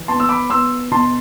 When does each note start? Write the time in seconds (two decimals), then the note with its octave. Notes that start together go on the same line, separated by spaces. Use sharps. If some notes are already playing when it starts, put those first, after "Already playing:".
Already playing: E3
0.08 B3 A5 C6
0.20 E6
0.29 B5 D6
0.50 B3 C6 E6
0.91 B2 A5 C6